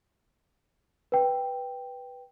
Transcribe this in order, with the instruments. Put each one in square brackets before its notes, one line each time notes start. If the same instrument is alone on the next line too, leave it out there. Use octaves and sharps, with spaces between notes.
[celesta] B4 G5